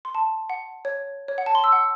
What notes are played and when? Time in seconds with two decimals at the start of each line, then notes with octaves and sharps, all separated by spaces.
0.05 C6
0.15 A5
0.50 F#5
0.85 C#5
1.28 C#5
1.38 F#5
1.46 A5
1.55 C6
1.64 E6
1.72 F#5